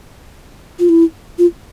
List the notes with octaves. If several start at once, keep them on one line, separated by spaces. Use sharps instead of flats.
F4
E4
F4